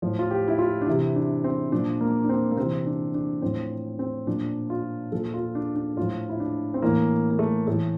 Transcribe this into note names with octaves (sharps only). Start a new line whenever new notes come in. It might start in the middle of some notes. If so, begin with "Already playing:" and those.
A2 F3
F4
G4
E4
F4
D4
C3 E3 E4
D4
C4
A#2 F3 D4
A#3
D4
C4
A#3
C3 E3 C4
D4
D4
A2 F3 C4
C4
A#2 F3 D4
F4
A#2 F3 A4
F4
D4
D4
A2 F3 F4
E4
D4
C4
A2 E3 A#3
A#3
A3
A2 E3 A3